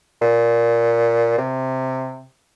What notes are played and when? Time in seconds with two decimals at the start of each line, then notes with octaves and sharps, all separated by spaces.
0.22 A#2
1.38 C3